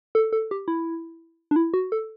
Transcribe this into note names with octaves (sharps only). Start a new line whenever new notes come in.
A4
A4
G4
E4
D4
E4
F#4
A4